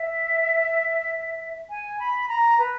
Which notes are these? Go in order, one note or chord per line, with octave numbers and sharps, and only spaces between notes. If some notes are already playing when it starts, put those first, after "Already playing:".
Already playing: E5
G#5
B5
A#5
B4